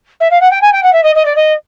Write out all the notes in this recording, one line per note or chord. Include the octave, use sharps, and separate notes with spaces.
E5
F5
F#5
G5
G#5
G5
F#5
E5
D#5
D#5
D5
D#5